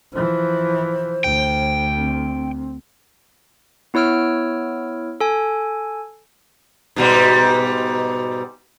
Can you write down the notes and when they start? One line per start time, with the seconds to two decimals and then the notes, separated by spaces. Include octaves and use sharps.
0.14 E3 F3 C5
1.24 D2 G5
1.98 C4
3.94 B3 E4 C#5 E6 F6 D7
5.21 A4 G#5
6.96 G#2 B2 G3